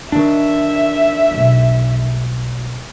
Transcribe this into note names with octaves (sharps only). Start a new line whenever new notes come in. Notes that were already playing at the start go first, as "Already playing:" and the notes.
D#3 D4 D#4 E5
F1 B1